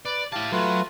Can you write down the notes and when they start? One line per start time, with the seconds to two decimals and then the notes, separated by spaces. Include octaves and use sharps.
0.05 B4 D5
0.32 E4 G4 F5 A5
0.52 F#3 A3 F4 B4